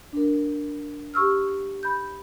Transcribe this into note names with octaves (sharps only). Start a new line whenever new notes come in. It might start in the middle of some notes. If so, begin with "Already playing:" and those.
D4 A#4
G4 C#6 E6 F6
B5 G6